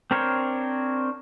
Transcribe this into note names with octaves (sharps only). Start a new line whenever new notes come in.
C4 D4 A#4 C5 C#5